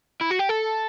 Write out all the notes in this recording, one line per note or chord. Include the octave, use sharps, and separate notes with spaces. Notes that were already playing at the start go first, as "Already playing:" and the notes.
E4
F#4
G4
A4